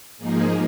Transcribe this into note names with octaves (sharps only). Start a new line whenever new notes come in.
G#2 F3 A#3 D#4 G#4